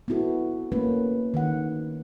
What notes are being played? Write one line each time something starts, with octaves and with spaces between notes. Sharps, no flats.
B3 C4 E4 F#4 A4
A3 A#3 C#4 B4
D#3 A3 F#5